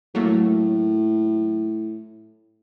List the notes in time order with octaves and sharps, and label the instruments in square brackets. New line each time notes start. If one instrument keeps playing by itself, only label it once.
[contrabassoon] A2 [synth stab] F#3 A3 A#3